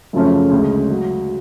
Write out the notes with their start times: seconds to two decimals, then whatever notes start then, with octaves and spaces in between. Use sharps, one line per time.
0.13 F#2 C#3 F3 A3 C#4
0.51 D2 C#3 G#3
0.91 F#3